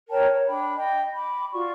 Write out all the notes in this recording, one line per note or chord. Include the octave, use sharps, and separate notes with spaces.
A#4 C#5 G5 A5
C#5
D4 G5 B5
D#5 G5
B5 D6
F4 F#4 D5 C#6